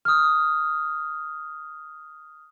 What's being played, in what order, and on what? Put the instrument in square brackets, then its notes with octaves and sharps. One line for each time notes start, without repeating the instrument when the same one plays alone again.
[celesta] D#6 F6